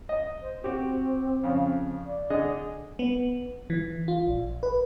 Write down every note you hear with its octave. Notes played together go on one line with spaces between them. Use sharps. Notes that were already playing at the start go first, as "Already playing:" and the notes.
D#5
C5
C4 F#4 G4
F2 C#3
D5
D3 G#4 D#5
B3
E3
F4
A#1
B4